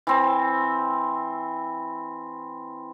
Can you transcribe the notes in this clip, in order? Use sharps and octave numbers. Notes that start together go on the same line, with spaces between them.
E3 C4